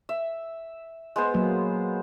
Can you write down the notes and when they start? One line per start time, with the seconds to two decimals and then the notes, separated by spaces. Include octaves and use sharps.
0.09 E5
1.16 G#3 B3 C5
1.34 F#3 A#3 G#4